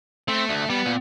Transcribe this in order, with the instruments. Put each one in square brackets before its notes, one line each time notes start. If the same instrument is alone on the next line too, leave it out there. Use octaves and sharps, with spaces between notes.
[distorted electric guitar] A3 [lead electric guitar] C4
[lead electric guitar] D2
[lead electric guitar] G3 [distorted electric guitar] B3
[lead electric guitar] A#2